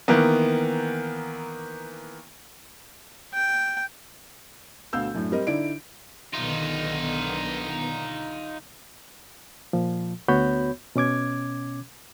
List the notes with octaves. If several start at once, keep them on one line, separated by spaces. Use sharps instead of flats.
D#3 E3 A#3 B3
G5
D2 B2 F5 E6 G6
F#2 A2 D4
G3 C4 A#4 D#5
D3 D#4 E4 D5 D7
B1 D3 D#3 B3 D#4 F4
A#2 F3
D2 B3 F#4 C#5 B5 G6
B2 C#4 D6 G#6